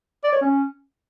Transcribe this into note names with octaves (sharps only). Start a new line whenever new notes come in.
D5
C#5
C#4